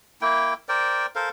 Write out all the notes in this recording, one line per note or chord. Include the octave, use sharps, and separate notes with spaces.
A#3 E4 G5
A#4 C5 D5 G5
A4 A#4 C5 F5